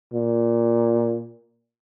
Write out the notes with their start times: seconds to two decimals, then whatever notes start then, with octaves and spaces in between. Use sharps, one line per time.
0.14 A#2